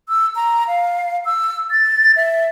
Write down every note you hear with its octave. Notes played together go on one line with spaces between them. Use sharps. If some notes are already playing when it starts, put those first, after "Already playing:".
E6
A#5
F5
E6
A6
E5